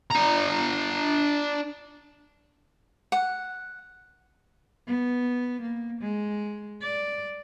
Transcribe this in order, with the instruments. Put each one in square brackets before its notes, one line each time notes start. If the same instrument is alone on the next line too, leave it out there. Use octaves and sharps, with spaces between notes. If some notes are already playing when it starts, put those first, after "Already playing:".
[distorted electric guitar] D4 A#5
[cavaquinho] F#5
[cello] B3
A#3
G#3
D5